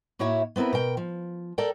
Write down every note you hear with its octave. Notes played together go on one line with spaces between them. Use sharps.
A2 A#3 E4 F#4 C#5 E5
B3 C4 E4 A#4 B4
B2 A#4 G5
F3
A4 A#4 D5 G5